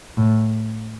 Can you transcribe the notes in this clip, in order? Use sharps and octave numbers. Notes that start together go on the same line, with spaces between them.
A2